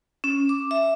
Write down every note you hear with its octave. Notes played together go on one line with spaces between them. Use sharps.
C#4
D6
E5